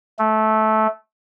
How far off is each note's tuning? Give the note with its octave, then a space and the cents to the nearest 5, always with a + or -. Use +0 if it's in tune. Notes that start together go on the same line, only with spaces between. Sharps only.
A3 -15